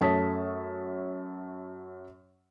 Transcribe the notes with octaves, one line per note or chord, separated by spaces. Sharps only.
F#2 A3 C#5 A5 D#6 B6